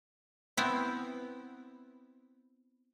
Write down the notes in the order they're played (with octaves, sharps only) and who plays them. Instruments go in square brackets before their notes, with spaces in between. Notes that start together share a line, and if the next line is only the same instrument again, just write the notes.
[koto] B3 C4 E4